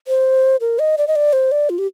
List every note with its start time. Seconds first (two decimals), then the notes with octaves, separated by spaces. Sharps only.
0.08 C5
0.61 A#4
0.79 D#5
0.98 D5
1.07 D#5
1.16 D5
1.33 C5
1.52 D5
1.70 F4
1.79 G4